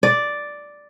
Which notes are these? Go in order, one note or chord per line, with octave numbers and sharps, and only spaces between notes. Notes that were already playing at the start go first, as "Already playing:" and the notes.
D5